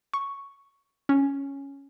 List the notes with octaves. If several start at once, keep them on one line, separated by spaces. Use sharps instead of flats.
C#6
C#4